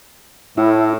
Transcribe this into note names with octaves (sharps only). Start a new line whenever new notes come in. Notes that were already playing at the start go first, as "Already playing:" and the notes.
A2 E4